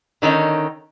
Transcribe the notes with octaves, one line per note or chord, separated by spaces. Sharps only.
D3 D#3 F#3 C#4 D#4